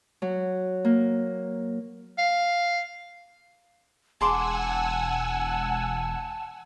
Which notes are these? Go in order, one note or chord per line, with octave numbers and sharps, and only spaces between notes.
F#3
A#3
F5
E1 G#4 F#5 G#5 A5 C6 D6 E6